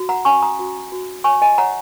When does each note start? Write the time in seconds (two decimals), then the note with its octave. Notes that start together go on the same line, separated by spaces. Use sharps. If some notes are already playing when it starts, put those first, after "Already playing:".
Already playing: F#4
0.09 F#5 A#5
0.25 C#4 G#5 C#6
0.43 A#5 D#6
0.59 F#4
0.92 F#4
1.24 C#5 G#5 C#6
1.42 D#5 G#5
1.58 C#5 F#5 A#5